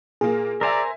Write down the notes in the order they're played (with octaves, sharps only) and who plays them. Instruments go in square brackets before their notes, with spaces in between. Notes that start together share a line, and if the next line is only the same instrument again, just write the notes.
[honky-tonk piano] A#2 A#3 [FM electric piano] G#4
[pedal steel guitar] A#4 C5 A#5 [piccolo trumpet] D5 [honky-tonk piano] E5 G#5 E6